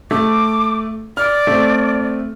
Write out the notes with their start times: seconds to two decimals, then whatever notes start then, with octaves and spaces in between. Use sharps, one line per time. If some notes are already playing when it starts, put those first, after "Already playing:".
0.11 A3 D6
1.17 D5 F6
1.47 A3 C4